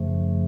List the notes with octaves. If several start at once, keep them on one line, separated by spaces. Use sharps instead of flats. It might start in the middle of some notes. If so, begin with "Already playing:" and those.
Already playing: F#2 C#3 F3 A3